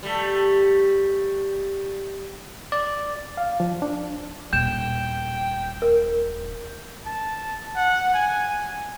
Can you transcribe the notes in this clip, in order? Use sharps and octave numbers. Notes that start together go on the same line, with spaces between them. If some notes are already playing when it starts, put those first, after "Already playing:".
G3 A3
D5
F5
F3
D4
D#1 G5 G6 E7
A#4
A5
F#5
G#5